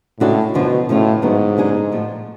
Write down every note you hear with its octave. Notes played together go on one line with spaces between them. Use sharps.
A2 C#3 G#3 D4 F#4 A4
F#2 B2 D3 F3
A2 C#3 F3 A3 C#4 F4
G#2 D3 F#3 B3
C#3 F#3 B3 D4 G#4
A2 F3 A3